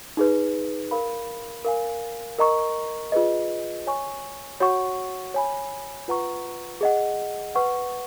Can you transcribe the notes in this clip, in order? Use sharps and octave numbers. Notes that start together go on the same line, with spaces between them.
D#4 G#4 B4
A#4 F5 B5
A#4 F5 G#5
A#4 D#5 A#5 C#6
F4 G#4 B4 D#5
C#5 G#5 C#6
F#4 C#5 F#5 C#6
C#5 G#5 B5
F4 B4 F#5 A#5 C#6
G#4 D#5 F#5
B4 F#5 C#6